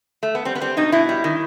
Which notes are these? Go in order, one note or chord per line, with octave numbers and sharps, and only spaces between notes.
A3
B3
G3 C4
B3
G3 C4
B2 D#4
B2 E4
G3
D#3